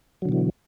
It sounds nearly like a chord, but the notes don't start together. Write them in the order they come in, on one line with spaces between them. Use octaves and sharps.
F#3 D3 B2 E3